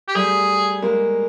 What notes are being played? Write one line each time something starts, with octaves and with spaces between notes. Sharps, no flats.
G4
G3 A3 G#4
G#3 A#3